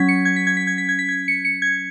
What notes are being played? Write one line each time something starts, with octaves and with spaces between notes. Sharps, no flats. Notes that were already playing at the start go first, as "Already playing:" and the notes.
Already playing: F#3 C#4 G#6 B6
C#7
G#6
B6
G#6
B6
G#6
B6
G#6
B6
G#6
C#7
C#7
G#6